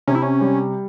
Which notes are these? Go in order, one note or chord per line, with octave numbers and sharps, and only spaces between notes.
C3 C#4
E4
C#4
G3